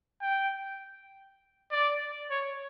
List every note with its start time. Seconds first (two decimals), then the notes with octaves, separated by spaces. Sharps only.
0.22 G5
1.72 D5
2.31 C#5